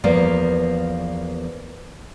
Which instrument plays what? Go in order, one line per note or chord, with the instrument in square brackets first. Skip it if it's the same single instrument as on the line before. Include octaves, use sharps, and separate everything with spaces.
[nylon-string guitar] E2 F3 A#3 B3 D5 F5